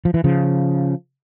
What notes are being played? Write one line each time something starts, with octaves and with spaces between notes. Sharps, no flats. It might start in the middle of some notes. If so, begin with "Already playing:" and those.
F3
E3
C#3 F3